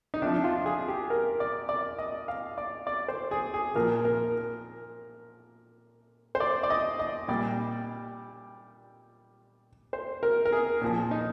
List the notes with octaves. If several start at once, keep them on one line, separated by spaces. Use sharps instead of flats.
D#4
C3 F3 D4
F4
G#4
G4
A#4
D5
D5
D#5
F5
D5
D5
C5
G#4
G#4
A#2 F3 A#4
A#4
C5
D5
D5
D#5
D#5
A#2 G3 D5
C5
A#4
A#4
G#4
A#2 F3
D#4